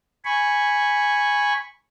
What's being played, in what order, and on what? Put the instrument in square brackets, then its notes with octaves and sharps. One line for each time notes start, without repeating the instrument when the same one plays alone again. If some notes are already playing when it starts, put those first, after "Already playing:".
[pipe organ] G#5 B5 C#6